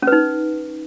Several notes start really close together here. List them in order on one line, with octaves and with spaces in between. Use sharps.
C#4 B4 D#4